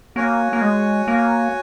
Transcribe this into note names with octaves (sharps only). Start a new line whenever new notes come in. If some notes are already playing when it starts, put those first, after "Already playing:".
A#3 F#4 C#5 G#5
A#3
G#3
A#3